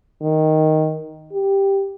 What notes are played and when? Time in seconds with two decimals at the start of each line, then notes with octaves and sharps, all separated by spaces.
0.21 D#3
1.32 G4